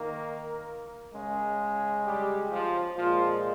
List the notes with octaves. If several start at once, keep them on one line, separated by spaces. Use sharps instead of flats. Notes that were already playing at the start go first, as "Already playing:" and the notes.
Already playing: D#3 A#3 A#4
C#3 G#3
G3 G4
F3 F4
A#2 F3 G#3 F4